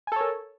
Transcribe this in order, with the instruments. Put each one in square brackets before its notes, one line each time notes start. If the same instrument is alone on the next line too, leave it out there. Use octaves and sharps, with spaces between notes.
[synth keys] G#5
A4
C#5
A#4